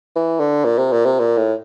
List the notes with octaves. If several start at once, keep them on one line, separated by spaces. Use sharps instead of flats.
E3
D3
A#2
C3
A#2
C3
A#2
A2